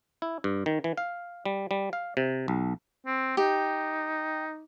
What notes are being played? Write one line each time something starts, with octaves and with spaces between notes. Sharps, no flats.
E4
G2
D#3
E3
F5
G3
G3
F5
C3
B1
C4
D#4 G4